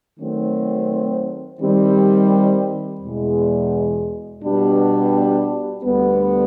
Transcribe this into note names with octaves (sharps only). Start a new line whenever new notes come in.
D#3 F#3 A3 C4
D#3 G3 C4
E2 B2 G#3
B2 G3 B3 D4 G4
D2 D3 G3 B3